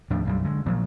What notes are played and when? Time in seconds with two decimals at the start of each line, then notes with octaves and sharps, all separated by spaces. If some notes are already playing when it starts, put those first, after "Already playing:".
0.10 D#2 A2 F3 D4
0.25 B1 F#2 G3
0.44 D3 G#3
0.66 A#2 F3 F#3